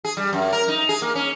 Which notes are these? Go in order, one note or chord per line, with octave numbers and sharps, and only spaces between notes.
G#4
G3
F#2
A#4
D#4
G#4
A#3
C#4